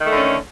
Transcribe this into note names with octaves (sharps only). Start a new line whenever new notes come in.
D3 D#3 A3 C#4